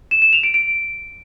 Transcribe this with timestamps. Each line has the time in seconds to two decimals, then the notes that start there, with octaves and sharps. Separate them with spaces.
0.11 E7
0.22 E7
0.33 F7
0.43 D7
0.54 D7